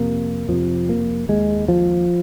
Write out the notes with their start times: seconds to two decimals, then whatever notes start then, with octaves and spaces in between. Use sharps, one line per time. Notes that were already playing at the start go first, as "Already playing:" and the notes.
Already playing: F2 C3 A#3
0.49 F2 C3 F3
0.89 A#3
1.29 D#2 G#3
1.68 F3